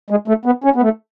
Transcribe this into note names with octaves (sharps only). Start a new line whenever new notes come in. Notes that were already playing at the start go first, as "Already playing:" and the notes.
G#3
A3
B3
C#4
B3
A3